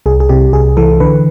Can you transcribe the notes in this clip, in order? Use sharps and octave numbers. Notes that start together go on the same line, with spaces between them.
C2 G#4
G#4
C3 G4
C2 G#4
E3 A4
D3 B4